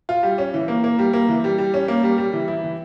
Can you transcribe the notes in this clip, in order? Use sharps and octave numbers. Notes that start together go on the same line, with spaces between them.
F4
G3
C#4
E3
A#3
A#3
G3
A#3
E3
G3
G3
C#4
A#3
G3
G3
E3
E4
E3